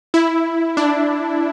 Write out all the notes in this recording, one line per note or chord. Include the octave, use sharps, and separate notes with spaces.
E4
D4